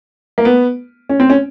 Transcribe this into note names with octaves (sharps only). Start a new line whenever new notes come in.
A#3
B3
C#4
C4
C#4